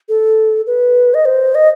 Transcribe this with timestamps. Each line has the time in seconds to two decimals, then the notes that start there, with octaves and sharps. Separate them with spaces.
0.09 A4
0.67 B4
1.14 D#5
1.25 C5
1.55 D#5